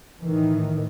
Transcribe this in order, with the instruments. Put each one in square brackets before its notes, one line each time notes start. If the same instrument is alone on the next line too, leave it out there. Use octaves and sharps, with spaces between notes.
[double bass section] A2 D#3 E3